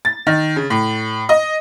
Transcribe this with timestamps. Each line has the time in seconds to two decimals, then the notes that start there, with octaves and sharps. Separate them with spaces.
0.05 A6
0.27 D#3
0.56 C#3
0.70 A2
1.29 D#5